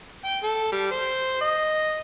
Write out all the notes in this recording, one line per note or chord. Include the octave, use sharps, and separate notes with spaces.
G5
A4
G3
C5
D#5